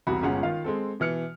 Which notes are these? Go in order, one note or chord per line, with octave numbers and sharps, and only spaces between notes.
E1 C2 F#4 B5
G1 G#3 C#4 F4 F#5
D#3 F4 F5
G#3 C4 A4
B2 E3 F6 C#7